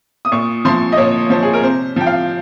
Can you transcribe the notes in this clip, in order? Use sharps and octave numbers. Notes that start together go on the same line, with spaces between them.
D#6
A#2 C#6
F3 C6
D#5
A#2 C#5
F3 C5
G#4
A#4
C3 C5
F3 G5
F5